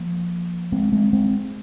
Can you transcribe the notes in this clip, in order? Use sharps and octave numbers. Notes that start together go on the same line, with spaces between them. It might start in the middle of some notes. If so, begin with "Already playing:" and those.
Already playing: F3 A#3
G#3 C4
G#3 C4
G#3 C4